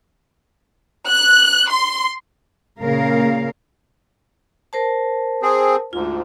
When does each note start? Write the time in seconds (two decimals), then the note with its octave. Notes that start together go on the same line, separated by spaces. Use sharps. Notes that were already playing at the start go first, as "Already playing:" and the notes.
1.08 F#6
1.69 C6
2.79 A#2 C#3 A#3 A#4 F5
4.73 A#4 C5 A5
5.42 C4 G#4
5.93 D2 G#2 F4